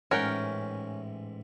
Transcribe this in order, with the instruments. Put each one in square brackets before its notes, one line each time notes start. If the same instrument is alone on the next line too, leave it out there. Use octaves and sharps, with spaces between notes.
[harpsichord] A1 G#2 E3 [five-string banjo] C#4 [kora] A#4 F#5 G5